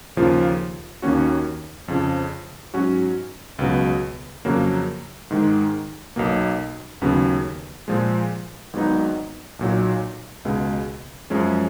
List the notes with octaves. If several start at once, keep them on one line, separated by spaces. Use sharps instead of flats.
D#2 C#3 F3 A#3 F4
D#2 D#3 A#3 C#4 F#4
F2 C#3 F3
G#2 F#3 C#4 F#4
C#2 B2 F#3 B3
F2 C#3 F#3 A#3
G#2 D#3 G#3
B1 B2 A#3
D#2 C#3 F#3 B3
A#2 F3 G#3
G#1 G#2 F#3 B3 D#4
B1 A#2 F#3
C#2 B2 G#3
F#2 F3 G#3 C#4